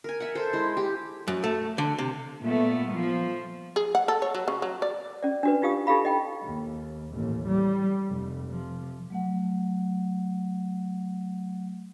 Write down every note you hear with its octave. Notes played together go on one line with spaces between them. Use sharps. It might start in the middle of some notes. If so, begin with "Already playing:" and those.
A#4 G#5
E5 F#5
A4 C5
G#3 E4
G4
F#2
A3
D3
C3
A#2 A3 B3
F3
G#4
F#5
A4
C#5
F#3
C#3
F#3
D5
C#4 D5
D4 F#4 B4
D#4 F4 G4 F5 D#6
D#4 E4 G4 A4 F5 B5
D#5 G5 B5
D#2
A1 D#2
G3
F1
C3 F3
F#3 A3 F#5